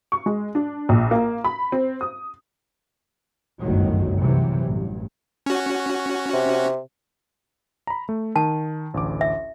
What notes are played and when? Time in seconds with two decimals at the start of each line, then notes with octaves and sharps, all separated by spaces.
0.12 C#6
0.26 G#3
0.55 D4
0.89 A#1
1.11 A#3
1.44 B5
1.72 C4
2.01 D#6
3.61 G1 C2 F#2 A2 D#3 F#3
4.19 C3 E3 F#3
4.62 A1 G2
5.46 C#4 F#4
6.33 C3
7.87 A#5 B5
8.09 A3
8.36 D#3 A5
8.94 A1 D2 D6
9.21 E5